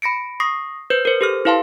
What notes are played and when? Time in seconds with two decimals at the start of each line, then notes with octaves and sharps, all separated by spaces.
0.02 B5 A#6 C#7 D7
0.40 C#6 D#6 A#6 C7
0.90 B4 C5 G6
1.05 A#4 C5
1.21 G4 A4 F6
1.45 E4 B4 F5 A5 C6